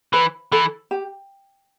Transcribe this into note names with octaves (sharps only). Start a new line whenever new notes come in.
E3 B4
E3 A4
G4